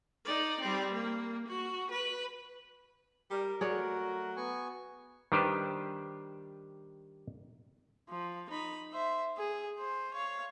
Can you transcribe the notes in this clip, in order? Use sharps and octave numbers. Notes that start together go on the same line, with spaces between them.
D#4 D5
G3 C4
A#3
F#4
B4
G3 A#4
F#3 A3 F#4 G#4 C#5 D5
B3 G#5 C#6
D#3 G3 D4 G4 B4 C5
F3
D#4 B5
C5 E5
G#4
C5
C#5 F5